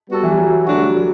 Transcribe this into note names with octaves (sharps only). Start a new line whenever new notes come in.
G3 B3 F#4 A4
E3
G3
F#3
D3 F#3 A3 D4 F#4
G3
F#3
F#3